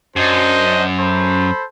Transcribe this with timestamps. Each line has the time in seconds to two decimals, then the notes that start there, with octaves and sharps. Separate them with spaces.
0.16 F#2 D4 C5 D#5
0.99 A4 C5 B5